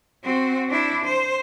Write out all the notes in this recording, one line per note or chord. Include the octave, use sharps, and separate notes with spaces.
C4 F#4
D4 E4
C5